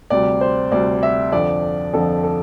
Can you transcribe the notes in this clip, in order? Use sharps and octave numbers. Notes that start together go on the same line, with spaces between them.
D2 C3 G3 D5
C5
D2 C3 G3 D5
E5
F2 D3 F3 D5
F2 D3 F3 A4
A4